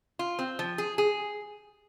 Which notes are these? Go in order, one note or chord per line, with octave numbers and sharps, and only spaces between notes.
F4
C4
F3
G#4
G#4